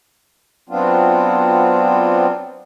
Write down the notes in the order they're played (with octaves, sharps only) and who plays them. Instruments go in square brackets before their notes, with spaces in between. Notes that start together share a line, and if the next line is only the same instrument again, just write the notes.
[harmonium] F#3 B3 C4 D4 F4